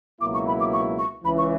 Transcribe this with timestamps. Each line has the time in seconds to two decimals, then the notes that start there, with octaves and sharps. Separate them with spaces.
0.21 C#2 B2 F#3 A#3 E4 D6
0.34 C#6
0.47 B5
0.60 D6
0.73 C#6
0.99 C#6
1.25 C#2 C#3 E3 B5
1.38 C#6